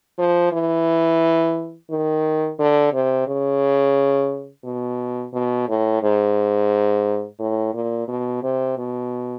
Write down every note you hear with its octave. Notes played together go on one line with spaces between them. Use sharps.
F3
E3
D#3
D3
C3
C#3
B2
B2
A2
G#2
A2
A#2
B2
C3
B2